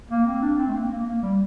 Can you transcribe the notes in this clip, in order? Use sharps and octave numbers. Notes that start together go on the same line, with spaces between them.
A#3
C4
D4
C4
A3
A#3
A#3
A#3
G3